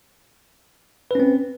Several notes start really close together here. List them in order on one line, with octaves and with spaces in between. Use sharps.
B4 C#4 C4